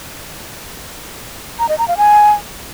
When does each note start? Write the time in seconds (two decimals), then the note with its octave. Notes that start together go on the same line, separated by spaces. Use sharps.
1.59 A#5
1.69 D#5
1.78 A#5
1.88 F5
1.97 G#5